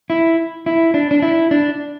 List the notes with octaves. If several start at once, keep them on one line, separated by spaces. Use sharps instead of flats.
E4
E4
D4
D4
E4
D4